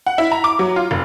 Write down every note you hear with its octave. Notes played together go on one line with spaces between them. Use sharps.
F#5
E4
A#5
D6
F#3
F4
F1